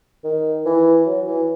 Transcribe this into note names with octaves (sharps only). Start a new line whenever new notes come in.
D#3
E3
F#3
E3